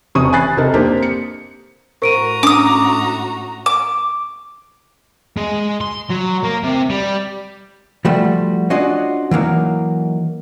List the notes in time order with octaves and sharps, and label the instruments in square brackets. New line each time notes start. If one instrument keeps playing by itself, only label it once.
[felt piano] E1 C3 C#4 C#6 D#6 D#7
G#5 B5 F#6 A6 C7
C3 D#4 A4 A#4
A#3 C4 D4 G4 A#4
C#7
[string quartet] A2 F#4 A#5 [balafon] A#4 C5 [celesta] C#6 D7 D#7
[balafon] C#4 D4 [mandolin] D6 D#6
[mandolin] D6
[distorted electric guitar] G#3
C6
F#3
A#3
C3
G3
[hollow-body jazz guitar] F3 G3 A3 F#4
C#4 D4 F4 F#4 D#5
E3 F#3 A#3 D#4